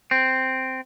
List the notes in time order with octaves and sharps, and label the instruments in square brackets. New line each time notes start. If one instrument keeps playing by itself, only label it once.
[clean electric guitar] C4